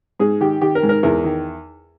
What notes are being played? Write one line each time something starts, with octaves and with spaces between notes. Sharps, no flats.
G#2 G#4
D#3 G4
D#3 G4
A#4
G#2
A#4
E2 A#4
D#3